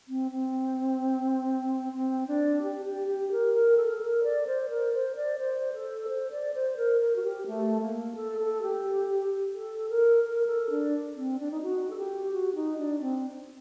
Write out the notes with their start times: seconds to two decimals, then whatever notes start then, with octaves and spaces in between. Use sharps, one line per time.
0.08 C4
0.31 C4
1.92 C4
2.27 D4
2.62 G4
2.86 G4
3.08 G4
3.32 A#4
3.54 A#4
3.77 A4
3.91 A4
4.01 A#4
4.23 D5
4.47 C5
4.69 A#4
4.93 C5
5.16 D5
5.39 C5
5.73 A4
6.08 C5
6.31 D5
6.54 C5
6.77 A#4
7.01 A#4
7.16 F#4
7.23 G4
7.47 A3
7.81 A#3
8.16 A4
8.39 A4
8.62 G4
9.55 A4
9.89 A#4
10.24 A#4
10.47 A4
10.70 D4
11.15 C4
11.39 D4
11.51 D#4
11.62 F#4
11.90 A4
11.97 G4
12.32 F#4
12.55 D#4
12.78 D4
13.01 C4